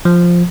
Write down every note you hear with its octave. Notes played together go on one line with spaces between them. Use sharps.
F3